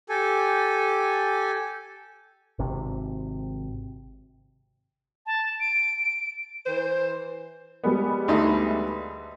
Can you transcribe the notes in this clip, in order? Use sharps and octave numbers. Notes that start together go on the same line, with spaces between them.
G4 A4 G#5
G#1 C3
A5
D7
E3 C5
G3 G#3 B3
D2 A3 D#4